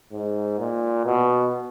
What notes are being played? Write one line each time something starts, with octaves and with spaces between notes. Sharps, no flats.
G#2
A#2
B2